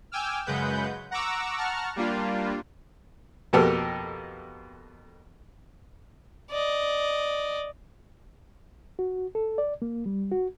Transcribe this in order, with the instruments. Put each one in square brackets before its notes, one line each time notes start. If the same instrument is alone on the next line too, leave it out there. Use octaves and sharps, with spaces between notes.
[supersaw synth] G5 G#5 D6 E6 F6
F#2 C#3 G#3 B4 F#5 G6
F#5 A#5 C#6 D6 E6
F#5 A5 A#5 C#6 F6
G3 A#3 D4 F4
[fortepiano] F2 B2 A#3 G4 A4 A#4
[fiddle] D5 D#5
[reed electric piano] F#4
A4
D5
A#3
G3
F#4